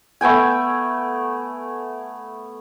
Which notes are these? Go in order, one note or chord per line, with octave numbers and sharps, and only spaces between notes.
A3 B3 G5 G#5